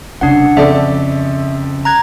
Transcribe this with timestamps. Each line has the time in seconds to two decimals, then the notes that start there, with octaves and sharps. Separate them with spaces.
0.21 F#1 C2 C#3 D4 F#5
0.57 F2 C#3 A4 D5 E5
1.85 A#5 F#6 G#6